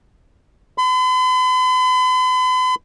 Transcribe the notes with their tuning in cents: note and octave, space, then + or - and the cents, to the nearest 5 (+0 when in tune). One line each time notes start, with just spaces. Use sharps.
B5 +45